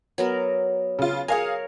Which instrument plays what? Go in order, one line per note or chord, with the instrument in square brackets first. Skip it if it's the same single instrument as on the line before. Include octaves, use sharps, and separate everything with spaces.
[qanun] F#3 B3 A#4
[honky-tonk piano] C#3 F4
[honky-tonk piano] G#4 F5 G#5 [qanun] A#4 C#5